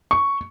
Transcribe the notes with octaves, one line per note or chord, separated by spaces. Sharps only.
C#6